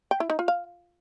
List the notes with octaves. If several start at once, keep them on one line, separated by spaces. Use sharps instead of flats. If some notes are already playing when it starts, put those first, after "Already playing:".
G5
E4
D#4
F4
F5